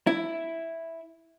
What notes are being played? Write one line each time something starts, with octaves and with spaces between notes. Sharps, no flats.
E4